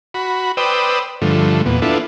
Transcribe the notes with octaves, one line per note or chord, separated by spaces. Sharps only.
F#4 B5
B4 C5 D5 G5 D#6 E6
G2 D3 F3 A3
E2 A#2 B3
B3 D4 E4 F4 A4